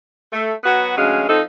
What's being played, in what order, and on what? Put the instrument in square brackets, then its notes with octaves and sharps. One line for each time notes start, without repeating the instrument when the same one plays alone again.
[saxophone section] A3
F#3 B3 F#4 B4
D2 F#3 G#3 C#4 F5
F3 C4 D#4 A4